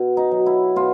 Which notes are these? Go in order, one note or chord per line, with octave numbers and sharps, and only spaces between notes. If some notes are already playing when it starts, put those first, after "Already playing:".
Already playing: B2
D#4
F#3
E4
B2 F4